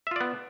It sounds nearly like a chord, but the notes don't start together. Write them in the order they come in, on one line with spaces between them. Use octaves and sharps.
E5 F4 D5 B3